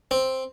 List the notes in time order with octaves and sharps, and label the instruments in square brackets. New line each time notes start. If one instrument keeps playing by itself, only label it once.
[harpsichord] C4